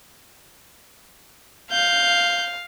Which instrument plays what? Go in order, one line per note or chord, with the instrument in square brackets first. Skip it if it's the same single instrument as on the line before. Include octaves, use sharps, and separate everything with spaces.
[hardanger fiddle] F5 [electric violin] G6